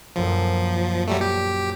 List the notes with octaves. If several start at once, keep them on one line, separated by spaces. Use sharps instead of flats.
A#1 F#2 F3
F#3 G3 A3
G4